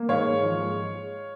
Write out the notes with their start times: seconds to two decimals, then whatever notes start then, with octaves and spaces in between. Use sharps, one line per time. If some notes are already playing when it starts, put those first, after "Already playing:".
Already playing: A#3
0.09 G#2 C#5 F5
0.26 G#2
0.43 F3
0.61 G#3